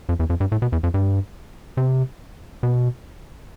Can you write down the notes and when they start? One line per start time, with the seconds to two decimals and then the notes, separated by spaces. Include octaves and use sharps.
0.09 F2
0.20 E2
0.30 F2
0.40 G2
0.52 A2
0.62 B2
0.72 E2
0.83 F2
0.94 G2
1.77 C3
2.63 B2